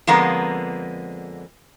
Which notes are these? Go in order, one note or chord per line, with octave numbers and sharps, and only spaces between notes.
F2 D3 G#3 A#3 B3 A#5